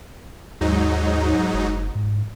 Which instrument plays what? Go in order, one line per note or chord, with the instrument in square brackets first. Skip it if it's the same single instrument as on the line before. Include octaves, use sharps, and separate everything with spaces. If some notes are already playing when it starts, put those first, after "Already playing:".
[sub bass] D#2 [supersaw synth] G#2 F#3 D#4
[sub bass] F#1
G#2